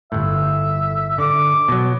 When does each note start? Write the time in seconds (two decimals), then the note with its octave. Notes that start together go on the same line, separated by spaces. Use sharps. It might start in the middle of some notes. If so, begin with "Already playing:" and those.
0.12 G1 A2 E5
1.18 D3 D6
1.68 B2 F#3